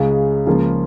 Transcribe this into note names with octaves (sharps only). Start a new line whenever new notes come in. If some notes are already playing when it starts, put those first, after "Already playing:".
Already playing: C#2 C#3 G#3
C#2 C#3 F3 A#3 F4